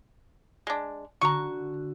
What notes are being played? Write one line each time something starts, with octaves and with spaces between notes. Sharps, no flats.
G#3 D4
D3 F#4 A#5 C#6